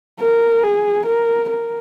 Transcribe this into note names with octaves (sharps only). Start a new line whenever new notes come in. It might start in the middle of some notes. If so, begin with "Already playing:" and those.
A#4
G#4
A#4
A#4